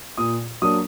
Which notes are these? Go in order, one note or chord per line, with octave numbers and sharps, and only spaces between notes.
A#2 D#6
F#3 A#3 D4 D#6